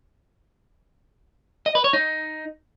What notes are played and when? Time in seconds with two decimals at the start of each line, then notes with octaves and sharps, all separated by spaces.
1.66 D#5
1.75 B4
1.84 C#5
1.93 D#4